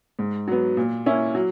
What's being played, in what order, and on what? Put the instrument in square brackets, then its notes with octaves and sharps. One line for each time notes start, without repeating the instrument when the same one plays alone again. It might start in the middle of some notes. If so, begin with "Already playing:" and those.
[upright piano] G#2
F#3 B3
A#2
A#3 C#4 E4
F#3